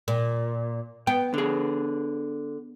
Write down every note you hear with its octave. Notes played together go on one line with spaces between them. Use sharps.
A#2
B3 G5
D3 G#4